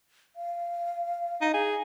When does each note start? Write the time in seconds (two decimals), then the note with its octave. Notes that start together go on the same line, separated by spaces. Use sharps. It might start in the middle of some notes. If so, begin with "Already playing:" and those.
0.36 F5
1.41 D#4
1.54 G#4